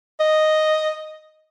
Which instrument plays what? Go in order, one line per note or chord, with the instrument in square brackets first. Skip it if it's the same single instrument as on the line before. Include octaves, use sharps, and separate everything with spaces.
[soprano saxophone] D#5